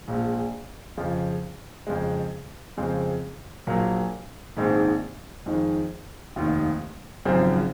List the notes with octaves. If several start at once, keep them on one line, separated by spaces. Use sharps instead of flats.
A#1 A#2 G#3
F2 C#3 F3
F2 C#3 G#3
F2 C#3 G#3 C4
A#1 A#2 F#3 A#3
A#1 G#2 D#3 G#3 C4
F2 D#3 G#3
F1 D#2 D#3
G#1 F#2 C#3 F3 C4